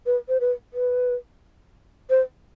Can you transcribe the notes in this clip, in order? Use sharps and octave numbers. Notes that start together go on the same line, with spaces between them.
B4
C5
B4
B4
C5